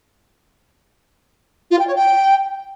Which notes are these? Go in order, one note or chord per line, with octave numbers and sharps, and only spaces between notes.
F4
G5
C#5
G5